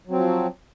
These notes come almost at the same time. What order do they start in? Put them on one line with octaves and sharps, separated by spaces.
F#3 C4 F3